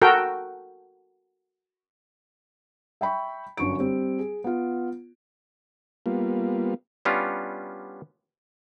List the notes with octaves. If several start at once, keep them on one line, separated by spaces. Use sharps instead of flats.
F#4 A4 A#4 G5
E5 G5 B5 C#6
G1 F#2 D3 C#6 D7
G3 C4
G#4
B3 F4
G3 A#3 B3 F4
G3 B3 C#4 D4 F4